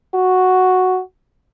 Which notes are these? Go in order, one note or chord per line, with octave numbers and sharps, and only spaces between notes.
F#4